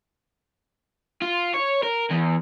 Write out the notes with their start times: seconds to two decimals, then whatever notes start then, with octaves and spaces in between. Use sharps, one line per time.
1.22 F4
1.54 C#5
1.83 A#4
2.11 E2